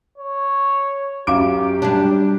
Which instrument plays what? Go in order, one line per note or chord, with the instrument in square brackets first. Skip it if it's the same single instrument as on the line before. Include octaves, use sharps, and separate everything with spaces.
[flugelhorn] C#5
[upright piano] F#2 D7 [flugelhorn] G4 [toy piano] F5 A#5 D6
[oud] G3 D4